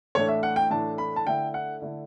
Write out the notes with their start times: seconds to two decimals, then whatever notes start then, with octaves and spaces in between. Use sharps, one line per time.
0.15 A2 E3 A3 D4 C#5
0.28 E5
0.43 F#5
0.56 G5
0.70 A2 E3 A3 D4 A5
0.98 B5
1.16 A5
1.26 D3 A3 E4 G5
1.54 F#5
1.82 D3 A3 E4